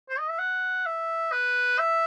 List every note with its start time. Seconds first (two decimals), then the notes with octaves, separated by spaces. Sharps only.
0.09 C5
0.19 D#5
0.30 E5
0.39 F#5
0.86 E5
1.32 B4
1.79 E5